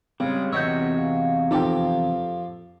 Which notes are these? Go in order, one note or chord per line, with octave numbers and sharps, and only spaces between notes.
C#3 G3 G#3 C4 C#4
E2 C3 F#4 C#5 D#5 E6 G6
F5
F2 D#4 G4 A4 G5